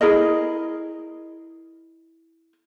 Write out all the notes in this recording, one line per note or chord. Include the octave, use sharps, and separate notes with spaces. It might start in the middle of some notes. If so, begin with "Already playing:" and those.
E4 G#4 A#4 D#5